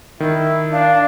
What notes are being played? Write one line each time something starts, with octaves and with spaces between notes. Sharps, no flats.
D#3 E4
D4 F5